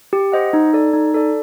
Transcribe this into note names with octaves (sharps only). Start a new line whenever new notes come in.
G4
C5 D#5 F#5
D#4
A4 D5
D#4
A4 D5